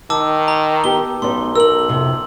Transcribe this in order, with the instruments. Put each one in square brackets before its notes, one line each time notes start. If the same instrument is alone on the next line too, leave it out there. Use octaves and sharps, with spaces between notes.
[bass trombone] D#3 [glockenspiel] A5 D6 E6
[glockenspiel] A#5
[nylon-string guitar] B3 G4 [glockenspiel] G7
[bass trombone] B1 [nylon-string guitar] B3 D4 D#4 [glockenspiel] C6
[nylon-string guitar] A#4 [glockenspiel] E6 F#7
[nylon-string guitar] F2 C3 F3